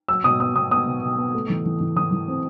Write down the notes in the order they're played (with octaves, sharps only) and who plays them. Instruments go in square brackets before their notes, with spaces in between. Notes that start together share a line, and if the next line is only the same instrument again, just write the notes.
[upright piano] F#3 E6
B2 D#6
B3 D#6
B2 D#6
B3 D#6
B2
B2
B3
A3
E3
E3
E3
E3 D#6
E3
C4